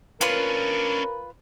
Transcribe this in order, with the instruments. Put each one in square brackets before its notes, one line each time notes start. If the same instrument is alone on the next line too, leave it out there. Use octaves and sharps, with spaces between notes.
[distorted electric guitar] C#4 D4 [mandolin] F4 B4 C6 [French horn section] A#4